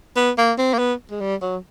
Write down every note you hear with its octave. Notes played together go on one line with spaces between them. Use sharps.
B3
A#3
C4
A#3
B3
G#3
G3
F#3